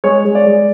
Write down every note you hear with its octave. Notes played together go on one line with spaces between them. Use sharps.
G#3 C#5
G#3
D5
G#3